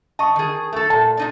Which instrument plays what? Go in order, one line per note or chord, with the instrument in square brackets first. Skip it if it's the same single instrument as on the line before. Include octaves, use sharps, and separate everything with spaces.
[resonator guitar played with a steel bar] D#5 [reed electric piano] A5 C#6
[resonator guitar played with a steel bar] D#3 G#4
A3 A4
[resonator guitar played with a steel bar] A#2 [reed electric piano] A5
[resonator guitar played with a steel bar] A#2 D#4 D5